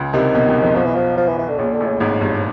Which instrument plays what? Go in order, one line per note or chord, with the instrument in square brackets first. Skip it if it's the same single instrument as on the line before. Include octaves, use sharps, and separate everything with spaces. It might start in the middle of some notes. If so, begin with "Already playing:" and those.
Already playing: [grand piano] C#2 C#3
[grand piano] C2 C3 [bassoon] D#3
[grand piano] B1 B2
C#2 C#3
F2 F3
[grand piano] B1 B2 [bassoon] F3
[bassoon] E3
F3
F3
E3
E3
D3
[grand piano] A#1 A#2 [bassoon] C#3
[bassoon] D3
[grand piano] A1 A2
[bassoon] C#3
[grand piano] G#1 G#2 [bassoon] C#3
[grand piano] G1 G2